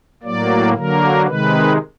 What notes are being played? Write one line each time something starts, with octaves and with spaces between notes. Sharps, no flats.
A2 F#3 A#3 D5
D3 F#3 A#3 A#4
C3 D#3 G#3 B4